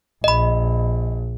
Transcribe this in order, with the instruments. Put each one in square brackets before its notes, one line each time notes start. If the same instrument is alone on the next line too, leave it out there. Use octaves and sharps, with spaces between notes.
[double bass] A#1 [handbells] D#5 B5